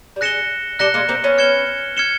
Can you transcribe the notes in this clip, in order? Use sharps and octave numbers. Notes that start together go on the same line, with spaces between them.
G3
G#3 F#6 A#6 C#7 E7 G7
G3 A3 F#6 A#6 C#7 E7 G7
G#3 A#3
A#3 C4
B3 C#4
F6 G#6 C#7 E7 G7
F6 G#6 C#7 E7 G7